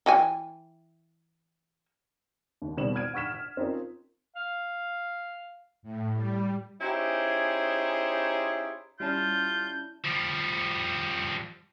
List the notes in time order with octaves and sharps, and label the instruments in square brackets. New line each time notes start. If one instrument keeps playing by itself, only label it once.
[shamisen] E3 G5 G#5
[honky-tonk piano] D#2
B2 D#3 G3 C4 E7 F#7
F6 G#6 D7 D#7
F#5 C#6 F6 B6 E7
F6
C4 C#4 D#4 F4 A#4
[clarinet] F5
[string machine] A2
G3
[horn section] C#4 D#4 E4 G4 G#4 C5
[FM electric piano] G3 C#4 [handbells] E4 D5 A5 [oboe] F4 [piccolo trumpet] G6
[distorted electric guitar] F3 G3